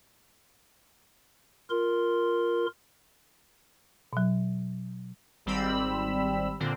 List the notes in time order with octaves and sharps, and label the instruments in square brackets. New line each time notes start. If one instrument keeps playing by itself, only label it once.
[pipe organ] F4 A#4 C6
[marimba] B2 F#3
[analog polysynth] G#1 G3 C4 B5 E6
A#2 D3 C4